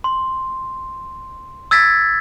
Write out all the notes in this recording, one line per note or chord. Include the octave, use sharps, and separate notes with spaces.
C6
E6 G#6 A6 B6